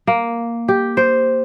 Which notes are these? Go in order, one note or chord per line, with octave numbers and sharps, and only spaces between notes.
A#3
G4
C5